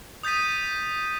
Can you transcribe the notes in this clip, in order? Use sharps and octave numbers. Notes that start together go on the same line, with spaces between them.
D#6 G6 A6 B6 D#7